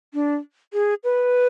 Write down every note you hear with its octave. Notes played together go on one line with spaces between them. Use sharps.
D4
G#4
B4